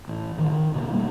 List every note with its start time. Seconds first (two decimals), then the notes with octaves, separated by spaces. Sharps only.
0.08 A1
0.36 A1 D#3
0.51 D#3
0.74 E1 B2 D3 A#3
0.92 B2 G3 A3 A#3